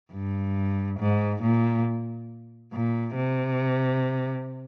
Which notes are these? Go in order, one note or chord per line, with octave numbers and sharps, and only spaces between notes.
G2
G#2
A#2
A#2
C3